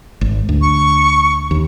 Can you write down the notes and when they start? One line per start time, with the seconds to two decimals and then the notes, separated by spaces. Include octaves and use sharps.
0.21 G#1
0.49 D2
0.61 C#6
1.51 D#2